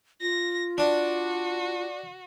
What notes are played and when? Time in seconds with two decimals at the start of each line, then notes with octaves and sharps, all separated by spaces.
0.21 F4 A#6
0.78 D4 F#4